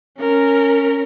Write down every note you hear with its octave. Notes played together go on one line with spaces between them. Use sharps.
C#4 A#4